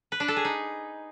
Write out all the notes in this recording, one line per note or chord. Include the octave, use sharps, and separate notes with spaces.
B4
D4
A4
G#4
D#4